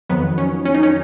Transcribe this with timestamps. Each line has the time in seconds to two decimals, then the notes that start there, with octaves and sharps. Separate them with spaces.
0.09 F2 D#3 F#3 B3
0.38 C#4
0.65 C#4
0.74 D#4
0.83 C#4